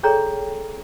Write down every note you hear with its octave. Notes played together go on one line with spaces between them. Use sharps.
G#4 A4 C#5 D5 G5 A#5